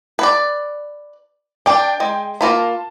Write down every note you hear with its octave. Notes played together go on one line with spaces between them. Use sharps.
B4 D5
D4 D5 G5
G#3
A#3 F4 A5 B5